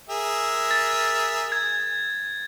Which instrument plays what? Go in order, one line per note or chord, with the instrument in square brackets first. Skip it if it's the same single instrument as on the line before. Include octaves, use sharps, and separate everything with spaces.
[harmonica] G#4 A#4 E5
[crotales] A6
G#6